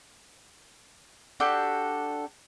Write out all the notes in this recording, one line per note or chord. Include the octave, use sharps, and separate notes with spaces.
D4 F#4 G4 A4